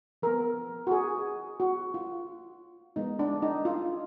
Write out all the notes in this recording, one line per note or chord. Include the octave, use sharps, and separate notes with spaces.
F3 B3 A#4
F#4
G#4
F#4
F4
F3 G#3 B3 D#4
D4
D#4
F4